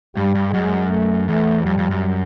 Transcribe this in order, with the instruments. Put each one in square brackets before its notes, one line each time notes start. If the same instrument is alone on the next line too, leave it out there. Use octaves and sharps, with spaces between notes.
[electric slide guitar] G2 [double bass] G3
[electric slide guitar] G2
[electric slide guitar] F#2 [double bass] G#3
[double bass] A3
[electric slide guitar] E2 [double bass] A3
[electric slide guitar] F2 [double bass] G3
[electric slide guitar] F2
F#2